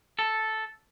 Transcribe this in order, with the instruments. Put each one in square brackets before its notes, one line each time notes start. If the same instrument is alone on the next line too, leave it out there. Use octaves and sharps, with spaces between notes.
[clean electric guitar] A4